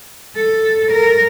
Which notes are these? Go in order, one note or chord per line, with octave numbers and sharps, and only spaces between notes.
A4
A#4